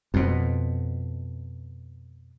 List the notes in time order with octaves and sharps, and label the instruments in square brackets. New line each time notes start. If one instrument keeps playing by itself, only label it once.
[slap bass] F2 B2